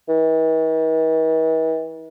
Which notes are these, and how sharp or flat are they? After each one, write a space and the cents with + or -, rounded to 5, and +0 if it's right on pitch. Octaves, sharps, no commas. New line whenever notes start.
E3 -45